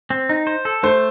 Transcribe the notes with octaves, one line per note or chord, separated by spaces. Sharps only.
C4
D#4
C5
A4
A3 C5